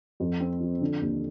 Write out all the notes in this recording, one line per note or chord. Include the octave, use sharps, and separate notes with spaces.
F2
C4
F3
D3
D#2